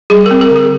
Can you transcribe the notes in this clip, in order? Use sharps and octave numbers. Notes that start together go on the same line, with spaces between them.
G3 G#4
A#4
C4
A#4
D3 G#4